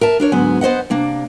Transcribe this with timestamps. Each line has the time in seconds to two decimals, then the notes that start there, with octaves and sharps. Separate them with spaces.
0.01 A#4 E5 A5
0.20 D4 A#4 C#5
0.32 D2 G#2 F#3 B3 G#5
0.61 B3 C5 D#5 F#5
0.90 C3 A#3 D4